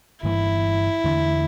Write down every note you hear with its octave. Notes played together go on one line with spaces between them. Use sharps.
G1 G2 E3 A#3 E4
E2 D3 A3 D4